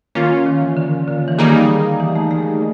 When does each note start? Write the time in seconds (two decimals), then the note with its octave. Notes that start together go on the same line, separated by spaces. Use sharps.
0.15 D#3 A#3 C#4 F4
0.46 D#3
0.61 E3
0.77 D3
1.08 D3
1.28 E3
1.38 D#3 G3 A#3 D#4 G#4
2.00 E3
2.15 A3
2.31 A3